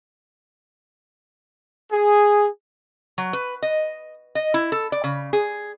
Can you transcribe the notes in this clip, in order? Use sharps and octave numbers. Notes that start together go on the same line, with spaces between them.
G#4
F#3
B4
D#5
D#5
E4
A4
D5
C#3
G#4